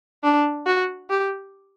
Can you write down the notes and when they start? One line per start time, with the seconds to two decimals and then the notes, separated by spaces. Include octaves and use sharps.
0.24 D4
0.66 F#4
1.10 G4